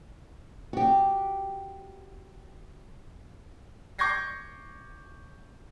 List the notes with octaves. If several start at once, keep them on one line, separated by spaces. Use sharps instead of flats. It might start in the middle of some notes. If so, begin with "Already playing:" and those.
F#4 G4
C#6 D6 G6 G#6 A#6 C7